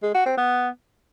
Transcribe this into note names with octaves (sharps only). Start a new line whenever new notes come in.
G#3
F#4
C4
B3